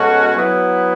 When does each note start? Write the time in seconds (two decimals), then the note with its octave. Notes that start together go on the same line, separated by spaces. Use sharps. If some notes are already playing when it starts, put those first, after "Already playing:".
Already playing: B2 G#3 C#4 F#4 A4
0.36 F#3 B3 E4